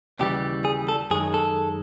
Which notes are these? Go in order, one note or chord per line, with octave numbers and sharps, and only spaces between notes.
D#2 C#3 E3 G3 G4
G#4
A4
F#2 D#3 G#3 G#4
A4